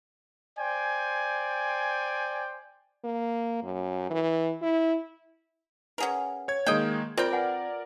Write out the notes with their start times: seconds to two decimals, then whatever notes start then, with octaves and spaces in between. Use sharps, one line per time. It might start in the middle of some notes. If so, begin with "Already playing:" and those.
0.58 C5 D5 G5 G#5
3.04 A#3
3.63 F#2
4.10 E3
4.62 E4
5.98 C#4 G#4 A#4 B4 F#5
6.48 C#5 G#6
6.66 D#3 G#3 A#3 D#5 G5
7.17 C4 F4 A#4 D5 G5
7.32 B4 F#5 G#5